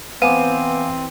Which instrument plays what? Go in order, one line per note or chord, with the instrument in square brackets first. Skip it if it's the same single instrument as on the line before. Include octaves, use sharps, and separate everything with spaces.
[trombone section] E3 C4 [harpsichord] B3 [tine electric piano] F5 G#5 D6 [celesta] D#7